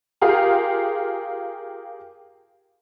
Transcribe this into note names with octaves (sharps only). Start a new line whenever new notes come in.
F4 G4 G#4 A#4 F5